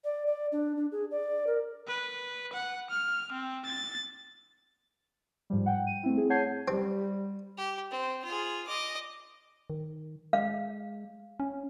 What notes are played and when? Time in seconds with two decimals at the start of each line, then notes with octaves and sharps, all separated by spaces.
0.04 D5
0.27 D5
0.52 D4
0.76 D4
0.92 G#4
1.11 D5
1.47 A#4
1.87 B4
2.53 F#5
2.90 F6
3.32 C4
3.65 A6
5.50 G#2 F3 G3
5.66 F#5 G5
5.87 D#7
6.03 A3 C4 E4
6.17 G#4
6.30 C#5 F#5 A5 G6 G#6 C7
6.68 G3 C4 G4
7.57 G4
7.91 C4
8.24 F4 G#4
8.67 D#5 D6
9.70 D#3
10.33 G#3 F5
11.40 C#4